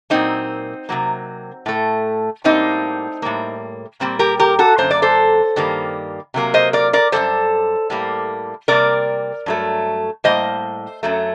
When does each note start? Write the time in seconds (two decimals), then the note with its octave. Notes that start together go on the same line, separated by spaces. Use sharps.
0.10 A#2 F#3 A#3 C4 D#4
0.89 C3 F#3 A#3
1.66 A2 A3
2.44 A2 G3 A#3 C4 D#4
3.22 A2 G3 A#3
4.00 A#2 G3 A#3 C4
4.19 G4 A#4
4.40 G4 A#4
4.59 F#4 A4
4.78 F#2 D3 F#3 A#3 C5
4.91 D5
5.02 A4 C5
5.56 G2 D#3 G3 A#3
6.34 C3 F#3 A#3
6.54 C5 D#5
6.73 A#4 D5
6.93 A#4 D5
7.12 F#2 D#3 G3 A4 C5
7.90 A2 G3 A#3
8.68 C3 G3 A#3 A#4 D5
9.46 G2 F#3 A3
10.24 A2 G3 A#3 C5 D#5
11.03 F#2 F#3 A3